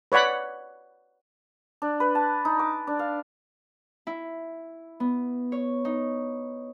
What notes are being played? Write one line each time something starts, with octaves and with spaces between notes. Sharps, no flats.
B4 C#5 D5 F#5 B5
D4
B4
A5
D#4
D6
D4
F5
E4
B3
C#5
D#4